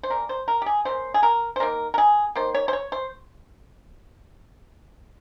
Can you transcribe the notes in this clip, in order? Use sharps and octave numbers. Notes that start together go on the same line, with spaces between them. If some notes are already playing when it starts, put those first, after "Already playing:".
C5
C#3 G3 A#3 A#4
C5
A#4
G4
G#4
C#3 G3 A#3 C5
G#4
A#4
C5
D#3 A#3 A#4
A#4
G#4
D#3 A#3 C5
C#5
C5
C#5
C5